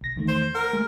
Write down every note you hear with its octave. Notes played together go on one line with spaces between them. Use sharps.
B1 A#6
E2 D#3 A3
C5
A#4 F#5
G#3 A3 G#4